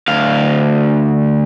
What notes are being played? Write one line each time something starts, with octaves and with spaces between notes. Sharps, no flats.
D2 F5